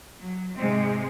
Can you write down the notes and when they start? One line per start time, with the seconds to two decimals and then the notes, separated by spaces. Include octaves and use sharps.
0.22 F#3
0.56 G#2 C3 G#3 C4